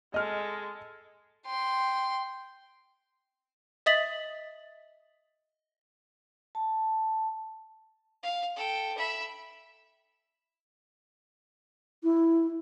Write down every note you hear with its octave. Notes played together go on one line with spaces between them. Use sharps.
G#3 A4 D#5 F6
G5 C6
D#5 E5 D#6 A6 B6 F#7
A5
F5
A4 G5
E5 B5
E4